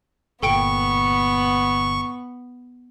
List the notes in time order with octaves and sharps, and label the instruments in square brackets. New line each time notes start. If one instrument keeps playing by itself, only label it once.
[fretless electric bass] G1 A#2 [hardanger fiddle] B3 [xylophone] A4 G5 D7 [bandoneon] C#6